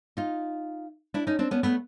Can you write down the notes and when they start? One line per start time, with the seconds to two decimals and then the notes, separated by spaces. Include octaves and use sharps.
0.17 D#4 F4
1.14 D4 E4
1.27 C#4 D#4
1.39 C4 D4
1.51 B3 C#4
1.63 A3 B3